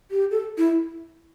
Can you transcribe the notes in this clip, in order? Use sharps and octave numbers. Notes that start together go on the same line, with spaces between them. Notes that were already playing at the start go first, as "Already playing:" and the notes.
G4
A4
E4